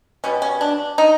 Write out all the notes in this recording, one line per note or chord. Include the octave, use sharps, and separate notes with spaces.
B2 G3 B3 C#4
C#4
D4
D#4